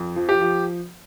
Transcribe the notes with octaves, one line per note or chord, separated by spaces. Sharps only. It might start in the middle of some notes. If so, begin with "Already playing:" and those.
Already playing: F2
F3
G4
F3